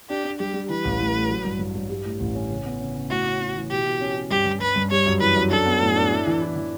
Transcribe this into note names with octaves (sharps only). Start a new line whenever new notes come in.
D4 G4
D4
G3 G4
G3
E3 B4
A1
A2
A3
F#3
G2
G2
G2
G3
A2
A1
C#4
C#3
B3
C#3
C#3
A2 F#4
C#4
C#4
E3
B2 G4
B2
C#4
C#4
G2 G4
G2
G2 B4
G2
G3 C#5
F#2
E3 B4
F#2
D4 A4
B3
A2
D4
E4
E3
E4
E3